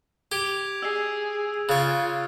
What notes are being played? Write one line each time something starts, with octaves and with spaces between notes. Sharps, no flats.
G4 G#6 D7 F7
G#4 E6 C7
C#3 F4 C#5 F5 F#6 A6